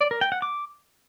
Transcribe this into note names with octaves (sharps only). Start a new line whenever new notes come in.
D5
A#4
G5
F#5
D6